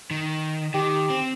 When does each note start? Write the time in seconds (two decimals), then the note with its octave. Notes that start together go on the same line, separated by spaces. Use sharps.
0.11 D#3
0.74 D#3 G4
1.10 C4